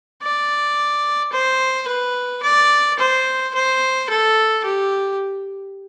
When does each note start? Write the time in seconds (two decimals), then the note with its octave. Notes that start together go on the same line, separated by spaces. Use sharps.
0.23 D5
1.33 C5
1.88 B4
2.43 D5
2.99 C5
3.55 C5
4.10 A4
4.65 G4